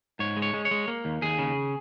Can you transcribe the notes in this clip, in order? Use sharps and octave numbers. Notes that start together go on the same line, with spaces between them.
G#2 C#5
G#3
C#5
G#3
C#5
G#3
A#3
D#2
D#2 G#4
C#3